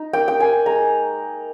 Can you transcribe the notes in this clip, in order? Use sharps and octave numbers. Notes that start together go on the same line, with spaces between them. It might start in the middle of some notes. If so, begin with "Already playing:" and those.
Already playing: D#4
A#3 G5
G5
A#3 G#5
G#3 A#5